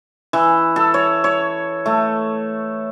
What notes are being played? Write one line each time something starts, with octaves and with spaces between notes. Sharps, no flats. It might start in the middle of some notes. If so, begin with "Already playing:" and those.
E3
A4
C#5
C#5
A3